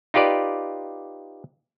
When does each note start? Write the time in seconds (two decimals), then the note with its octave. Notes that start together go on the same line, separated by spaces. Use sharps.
0.14 D#4 F4 G4 B4 D5